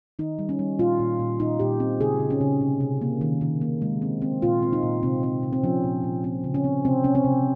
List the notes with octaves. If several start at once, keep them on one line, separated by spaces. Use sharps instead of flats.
D#3 D#4
G3
C#4
G3
A#2 F4
A#2
A#2
A#2 D#4
A#2 G4
C4
C#3 G#4
C#3
C#4
C#3
C3
C3
A#3
D#3
D#3
A#3
G#3
C4
C4
A#2 F4
C4
D#4
A#2
C3 C4
C4
C3
C4
F3 C#4
A#2
A#2
C4
C#3
C#4
C4
C3 C4
C3 C#4
C4
C3